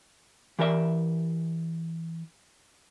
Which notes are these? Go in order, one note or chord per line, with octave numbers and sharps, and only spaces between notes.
E3 G4 A#4 D5 E5